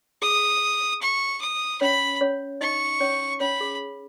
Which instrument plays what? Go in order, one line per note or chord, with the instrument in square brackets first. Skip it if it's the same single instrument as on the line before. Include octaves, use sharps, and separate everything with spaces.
[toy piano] G#4 [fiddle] D#6
[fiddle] C#6
D#6
[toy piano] C#4 C#5 [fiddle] B5
[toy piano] C#4 C#5
[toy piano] D#4 D#5 [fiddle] C#6
[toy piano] C#4 C#5
[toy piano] C#4 C#5 [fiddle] B5
[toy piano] G#4